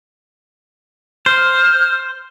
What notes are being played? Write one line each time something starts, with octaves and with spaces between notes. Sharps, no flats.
C5 F6